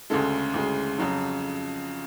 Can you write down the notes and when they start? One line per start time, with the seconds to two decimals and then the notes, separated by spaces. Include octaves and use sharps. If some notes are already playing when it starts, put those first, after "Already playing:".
0.10 D2 C#3 G#3 A4
0.54 D2 C#3 G#3
0.98 F2 C#3 F#3